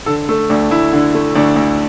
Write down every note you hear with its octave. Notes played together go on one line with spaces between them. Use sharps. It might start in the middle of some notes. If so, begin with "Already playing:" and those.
D3 A4
A3 A4
D2 D4
D2 E4
D3
A3
D2 D4
D2